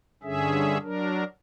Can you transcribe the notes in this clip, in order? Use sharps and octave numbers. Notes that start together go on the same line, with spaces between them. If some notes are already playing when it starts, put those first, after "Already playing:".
G2 D3 C#4 G#4 E5
F#3 D4 A#4